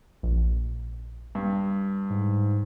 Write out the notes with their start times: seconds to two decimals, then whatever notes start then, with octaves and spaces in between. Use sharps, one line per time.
0.23 A#1
1.35 G2
2.10 G#2